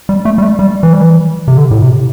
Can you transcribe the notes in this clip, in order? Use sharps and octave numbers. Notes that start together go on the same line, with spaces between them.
G3
A3
G3
A3
G3
E3
G3
E3
C3
D3
A2
C3